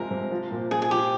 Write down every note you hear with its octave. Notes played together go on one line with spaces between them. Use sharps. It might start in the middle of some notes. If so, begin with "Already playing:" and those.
Already playing: C3 F3 G#3 A#4
C3
F3
A#2
F3 G#4
G#4
F3 G4